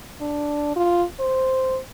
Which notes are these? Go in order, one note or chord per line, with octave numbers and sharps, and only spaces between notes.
D4
F4
C5